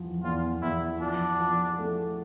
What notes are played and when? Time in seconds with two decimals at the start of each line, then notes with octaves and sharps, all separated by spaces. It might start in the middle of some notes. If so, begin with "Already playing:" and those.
Already playing: E2 F3
0.23 E2 F4
0.62 E2 E4
1.00 F3 D4
1.39 F3
1.78 A3